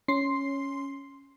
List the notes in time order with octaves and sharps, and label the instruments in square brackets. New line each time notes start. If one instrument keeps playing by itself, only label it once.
[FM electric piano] C#4 C6 C7